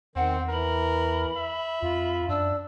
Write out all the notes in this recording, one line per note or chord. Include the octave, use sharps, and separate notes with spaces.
E2 D#3 C4 F#5
E3 A#4 B5
E5
F2 F4
F#2 D4 E6